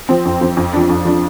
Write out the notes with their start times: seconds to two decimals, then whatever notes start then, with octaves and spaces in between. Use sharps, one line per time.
0.09 F3 C4
0.25 F2
0.41 F3 C4
0.57 F2
0.73 F3 D4
0.89 F2
1.05 F3 D4